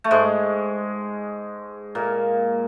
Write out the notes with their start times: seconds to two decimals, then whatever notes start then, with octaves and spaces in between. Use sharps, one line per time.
0.04 A3
0.11 G#2 G#3
1.95 A#2 A#3